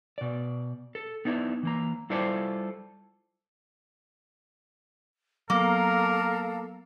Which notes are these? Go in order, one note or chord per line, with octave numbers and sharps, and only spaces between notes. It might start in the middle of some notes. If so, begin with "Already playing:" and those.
B2 D5
A4
B3 D#4 E4 D5
E3 A#3 A#5
G3 E4 F4 A4 C5 D5
F#3 A#3 B3 A4 A#4 F5 A#5